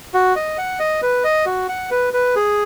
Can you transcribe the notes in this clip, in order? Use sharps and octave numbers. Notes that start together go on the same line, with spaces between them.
F#4
D#5
F#5
D#5
B4
D#5
F#4
F#5
B4
B4
G#4